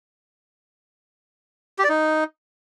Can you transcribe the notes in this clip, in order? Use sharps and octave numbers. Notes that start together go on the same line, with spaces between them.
G4
D5
D#4